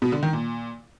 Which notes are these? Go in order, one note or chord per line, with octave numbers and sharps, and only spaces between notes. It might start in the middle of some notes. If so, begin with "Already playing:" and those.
B2
D3
D#3
A#2